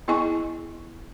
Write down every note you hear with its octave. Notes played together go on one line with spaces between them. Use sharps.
B3 E4 G#4 D#5 G#5 C#6